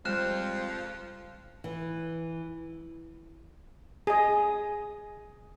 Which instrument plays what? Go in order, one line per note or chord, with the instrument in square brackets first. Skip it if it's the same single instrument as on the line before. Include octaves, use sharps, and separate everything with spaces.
[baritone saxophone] F3 [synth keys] G3 G#3 [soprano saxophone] C4 [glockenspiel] F6 F#6 E7
[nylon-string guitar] E3
[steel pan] G#4 D#5